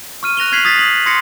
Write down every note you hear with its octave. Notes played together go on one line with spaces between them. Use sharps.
C#6 F6 D#7
F#6 A#6 F7 G7
F6 G#6 B6 C7 F7 F#7
D#6 G#6 A6 B6
F#7
C6 D#6 G#6 A#6 C7 C#7